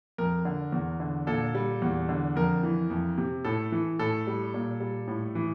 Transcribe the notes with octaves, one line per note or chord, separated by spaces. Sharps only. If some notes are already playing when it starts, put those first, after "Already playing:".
F2 A#4
D3
E2
D3
A#2 A4
G3
E2
D3
F2 A#4
E3
F2
C3
A2 A4
E3
A2 A4
G3
A#2
G3
A2
E3